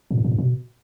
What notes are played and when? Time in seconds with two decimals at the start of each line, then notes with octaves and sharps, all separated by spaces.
0.11 A2
0.18 F#2
0.24 A2
0.31 F#2
0.38 B2